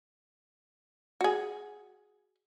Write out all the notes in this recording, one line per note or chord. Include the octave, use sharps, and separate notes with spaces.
F#4 G#4